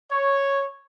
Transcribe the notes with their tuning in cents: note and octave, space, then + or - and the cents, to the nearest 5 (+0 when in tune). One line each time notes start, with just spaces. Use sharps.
C#5 -5